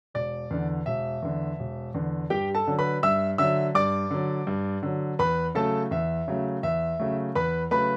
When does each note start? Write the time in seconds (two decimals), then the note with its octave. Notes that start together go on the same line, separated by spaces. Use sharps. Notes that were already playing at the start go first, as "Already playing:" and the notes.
0.14 E1 D5
0.50 E2 D3
0.86 E1 E5
1.22 E2 D3
1.59 E1
1.94 E2 D3
2.30 G2 G4 G5
2.55 A4 A5
2.67 D3 F#3
2.79 B4 B5
3.03 G2 E5 E6
3.38 D3 F#3 E5 E6
3.75 G2 D5 D6
4.11 D3 F#3
4.47 G2
4.83 D3 F#3
5.19 E2 B4 B5
5.55 C#3 F#3 A3 A4 A5
5.91 E2 E5
6.28 C#3 F#3 A3
6.63 E2 E5
7.00 C#3 F#3 A3
7.35 E2 B4 B5
7.71 C#3 F#3 A3 B4 B5